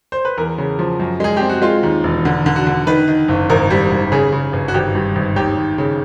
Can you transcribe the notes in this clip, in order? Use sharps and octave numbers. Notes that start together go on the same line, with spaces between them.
C5
B4
E2 A#4
C#3
F3
F#2
G#3 G#4
C4 G4
F#4
G#3 F4
D#2
E1
D3
D3
F#4
D3
D#3 B4
D#3
F#1
G#1 A#4
G3
G#1
C#3 G#4
C#3
G1
F#4
G#1 G4
G2
G#1
D#2 G4
D#2
C#3